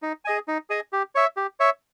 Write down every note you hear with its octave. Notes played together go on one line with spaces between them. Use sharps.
D#4
G#4 D#5 G#5
D#4
G#4 D#5 G#5
G4
C#5 E5
G4
C#5 E5